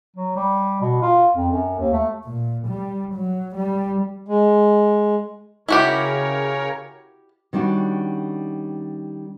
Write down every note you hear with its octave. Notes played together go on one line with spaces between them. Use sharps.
F#3
G3
B2
F4
F2
F#2
D#2
A3
A#2
G3
F#3
G3
G#3
C#3 E4 F#4 G4 A#4 C#5
D#3 G3 C#4 D4 F#4